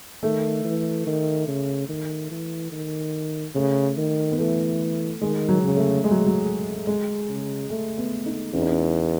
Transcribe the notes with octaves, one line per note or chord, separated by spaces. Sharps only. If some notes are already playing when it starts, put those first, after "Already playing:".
D#3 A3
E3
D#3
C#3
D#3
E3
D#3
C#3 A3
D#3
B3
E3 A3
D#3 G#3
F#3
C#3
A3
G#3
F#3
F#3
G#3
C#3
A3
B3
D#4
E2 C#4
D#4
C#4